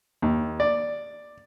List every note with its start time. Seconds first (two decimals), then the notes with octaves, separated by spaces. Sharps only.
0.22 D#2
0.60 D5